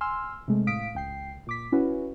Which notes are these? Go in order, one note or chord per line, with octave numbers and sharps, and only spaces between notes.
G#5 C6 E6 F6
C3 G#3 A3
A2 F5 D#6 B6 D7
C#2 G5 C7
A#2 D6 B6
C#4 E4 F#4 B4